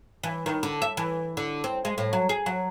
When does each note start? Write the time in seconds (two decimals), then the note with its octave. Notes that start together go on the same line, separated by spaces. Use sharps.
0.23 E3
0.46 D#3
0.63 D3
0.82 E5
0.97 E3
1.37 D3
1.64 C4
1.85 G#3
1.98 A2
2.13 F#3
2.29 G#4
2.46 F#3